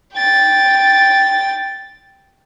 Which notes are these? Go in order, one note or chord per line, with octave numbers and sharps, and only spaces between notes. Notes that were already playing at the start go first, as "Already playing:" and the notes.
G5 A6